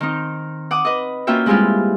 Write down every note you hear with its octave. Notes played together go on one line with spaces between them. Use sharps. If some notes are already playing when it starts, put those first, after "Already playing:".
D#3 C4 D#4
F#5 D6 D#6
B4 D#5
A#3 C#4 F4 F#4 E5 G5
G3 G#3 C4 E4 F4 G4